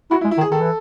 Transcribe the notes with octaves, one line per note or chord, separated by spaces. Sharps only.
E4 F#4
E4
G#3
E4
D#3
G#4
D#3 A4
E3